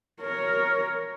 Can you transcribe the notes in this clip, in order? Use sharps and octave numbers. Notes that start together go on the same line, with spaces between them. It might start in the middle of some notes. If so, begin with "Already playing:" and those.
A#4 C#5